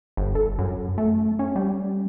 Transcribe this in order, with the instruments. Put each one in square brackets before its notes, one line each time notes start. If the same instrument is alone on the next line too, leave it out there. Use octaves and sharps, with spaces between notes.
[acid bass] G1
A4
F#2
A3
C#4
G3